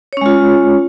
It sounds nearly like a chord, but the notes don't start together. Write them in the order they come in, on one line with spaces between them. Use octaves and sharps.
C#5 C#4 G#3 F4